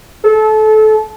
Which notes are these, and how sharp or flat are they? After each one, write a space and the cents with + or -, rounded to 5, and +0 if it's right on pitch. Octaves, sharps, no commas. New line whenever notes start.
A4 -25